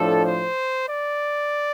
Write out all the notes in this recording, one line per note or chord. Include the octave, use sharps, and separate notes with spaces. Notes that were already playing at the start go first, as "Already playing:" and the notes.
Already playing: A2 F3 D4 A4
C5
D5